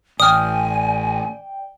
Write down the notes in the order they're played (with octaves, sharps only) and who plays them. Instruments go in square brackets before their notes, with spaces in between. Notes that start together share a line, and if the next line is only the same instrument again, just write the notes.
[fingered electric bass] A1 [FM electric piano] D5 G5 [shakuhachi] G#5 [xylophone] D#6 F6